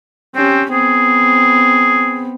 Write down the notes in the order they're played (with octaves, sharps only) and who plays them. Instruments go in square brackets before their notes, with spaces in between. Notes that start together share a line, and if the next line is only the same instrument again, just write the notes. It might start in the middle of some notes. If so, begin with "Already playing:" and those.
[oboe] C4 [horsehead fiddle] C#4 G4
[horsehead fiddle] B3 C4 [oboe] G#4